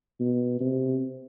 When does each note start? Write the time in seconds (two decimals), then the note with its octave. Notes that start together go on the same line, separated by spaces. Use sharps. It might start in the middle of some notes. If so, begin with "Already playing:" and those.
0.20 B2
0.61 C3